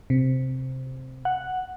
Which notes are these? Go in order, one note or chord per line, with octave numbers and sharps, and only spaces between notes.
C3
F#5